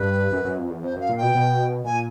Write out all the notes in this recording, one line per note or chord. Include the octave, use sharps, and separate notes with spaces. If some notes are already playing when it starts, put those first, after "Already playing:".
Already playing: G2 B4
F#2
F#2
F2
E2
F2 C5
F#2 F5
A#2
B2 G5
B2
A#2 G#5